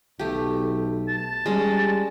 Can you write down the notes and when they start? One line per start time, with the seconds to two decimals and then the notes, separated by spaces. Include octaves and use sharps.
0.19 B1 A3 G4
1.09 A5
1.46 G3 G#3 C#4